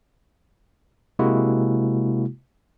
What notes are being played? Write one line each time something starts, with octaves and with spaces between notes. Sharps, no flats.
C3 G#3 A#3 E4 F#4